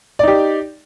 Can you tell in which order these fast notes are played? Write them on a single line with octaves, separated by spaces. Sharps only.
D5 D#4 G4